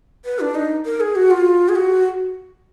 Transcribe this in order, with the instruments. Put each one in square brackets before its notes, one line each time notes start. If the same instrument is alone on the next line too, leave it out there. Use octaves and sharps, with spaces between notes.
[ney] B4
D4
D#4
A#4
G#4
F#4
F4
G#4
F#4